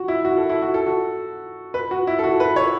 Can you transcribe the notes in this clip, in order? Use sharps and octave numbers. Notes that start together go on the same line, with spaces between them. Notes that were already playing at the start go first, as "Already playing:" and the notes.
Already playing: F#4
E4
F#4
A4
E4
F#4
A4
F#4
B4
F#4
E4
A4
F#4
B4
C#5